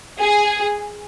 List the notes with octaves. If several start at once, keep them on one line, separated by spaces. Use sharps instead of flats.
G#4